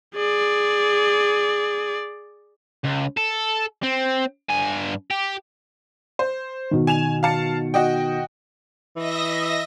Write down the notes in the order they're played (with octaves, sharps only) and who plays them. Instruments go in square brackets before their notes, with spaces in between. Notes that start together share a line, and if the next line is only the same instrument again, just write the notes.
[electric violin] G#4 D5
[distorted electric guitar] C#2
A4
C4
G2 G#5
G4
[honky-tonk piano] C5
[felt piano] B2 D#3
[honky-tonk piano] G#5 E7 F7
F5 A5 C#7
F#4 D#5 G5
[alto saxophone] E3 [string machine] D#5 E5 A#6